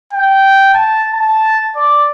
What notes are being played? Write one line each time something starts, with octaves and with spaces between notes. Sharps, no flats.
G5
A5
A5
D5